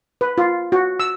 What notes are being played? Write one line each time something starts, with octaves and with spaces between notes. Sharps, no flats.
B4
F4
F#4
E6